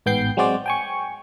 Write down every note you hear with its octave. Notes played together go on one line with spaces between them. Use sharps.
A1 G#2 B3 G5 G6 C7
F#3 G#3 C4 F#4 C5 D5
G5 G#5 C#6